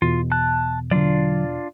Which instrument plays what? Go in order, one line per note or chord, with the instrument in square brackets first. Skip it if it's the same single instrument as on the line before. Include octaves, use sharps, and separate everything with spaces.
[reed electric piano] E2 B2 [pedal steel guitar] F4
[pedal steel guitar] A5 F#6
[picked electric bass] D3 F#3 [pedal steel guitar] D4 F4 D5